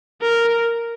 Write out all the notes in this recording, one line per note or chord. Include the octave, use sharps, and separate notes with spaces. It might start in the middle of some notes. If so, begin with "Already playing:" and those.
A#4